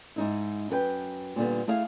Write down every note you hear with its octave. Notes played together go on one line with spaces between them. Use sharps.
G#2 D#4 E4
F#2 B4 G5
A#2 D3 G3 B3
A3 E4 G#4 F5